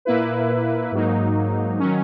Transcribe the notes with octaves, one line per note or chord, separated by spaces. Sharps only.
A#2 A#3 E4 B4
G#2 F#3 A#3 D#4
D#3 F#3 C#4